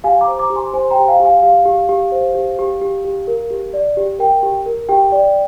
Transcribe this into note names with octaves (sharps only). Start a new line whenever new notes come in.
G4 F5 G#5
A#5 D6
C5
A#5 D6
G4
G#5 C6
C5 G#5 C6
G5 A#5
G4
F5 G#5
G4
F5 G#5
G4 F5
G4
G4
C5
G4
G4
G4
G4
A#4
G4
D5
G4
A#4 G5
G4
A#4
G4 G5
D5